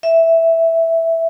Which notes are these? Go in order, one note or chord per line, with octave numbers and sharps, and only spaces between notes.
E5